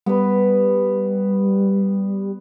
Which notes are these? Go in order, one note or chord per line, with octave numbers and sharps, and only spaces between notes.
G3 B3 B4